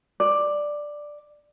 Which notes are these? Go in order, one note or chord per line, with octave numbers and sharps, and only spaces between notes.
D5